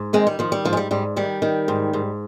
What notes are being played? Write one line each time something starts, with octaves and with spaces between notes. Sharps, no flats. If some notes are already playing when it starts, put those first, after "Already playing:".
Already playing: G#2
D#3 G#3 C4
G3
D#3 F3
G3
G#2 F3
G#3
G3
G#2 G3
D#3 G3
D#3
G#2
G#2